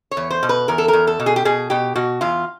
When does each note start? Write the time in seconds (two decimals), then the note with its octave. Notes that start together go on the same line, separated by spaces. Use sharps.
0.11 C#5
0.17 E2
0.31 C5
0.43 B2
0.49 B4
0.68 E2 A#4
0.78 A4
0.88 A#4
0.93 E2
1.07 A4
1.20 B2
1.26 G#4
1.36 G4
1.45 B2 G#4
1.70 B2 G4
1.96 B2 F#4
2.21 E2 F4